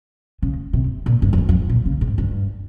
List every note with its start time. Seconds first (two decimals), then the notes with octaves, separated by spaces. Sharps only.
0.42 C#3
0.73 C3
1.06 A#2
1.22 G2
1.33 F2
1.38 G2
1.49 F2
1.59 G#2
1.69 A#2
1.86 C#3
2.01 G#2
2.18 G2